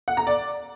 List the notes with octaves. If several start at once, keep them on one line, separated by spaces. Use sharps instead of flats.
F#5
A#5
D5